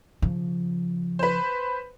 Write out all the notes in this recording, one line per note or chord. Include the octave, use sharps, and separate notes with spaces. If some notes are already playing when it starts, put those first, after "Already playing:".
C#3 F3
B4 C5